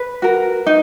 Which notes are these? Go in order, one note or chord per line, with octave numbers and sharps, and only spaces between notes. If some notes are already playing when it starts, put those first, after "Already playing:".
Already playing: B4
F#4 A#4
D#4